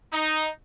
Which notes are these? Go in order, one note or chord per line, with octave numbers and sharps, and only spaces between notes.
D#4